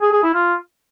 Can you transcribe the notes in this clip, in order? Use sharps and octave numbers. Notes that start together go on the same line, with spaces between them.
G#4
G#4
E4
F4